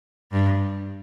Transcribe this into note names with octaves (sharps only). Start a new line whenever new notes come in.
G2